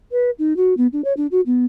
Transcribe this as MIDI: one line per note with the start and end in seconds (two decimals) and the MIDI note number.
0.11 0.30 71
0.39 0.56 63
0.56 0.77 66
0.77 0.87 59
0.93 1.01 62
1.04 1.13 73
1.17 1.27 62
1.31 1.41 66
1.46 1.65 59